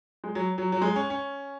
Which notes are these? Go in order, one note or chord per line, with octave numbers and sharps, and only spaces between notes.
G#3
F#3
F#3
F#3
G#3
C#4
C#4